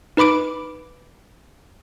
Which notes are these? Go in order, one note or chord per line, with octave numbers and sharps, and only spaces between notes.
D#4 B4 B5 D6 D7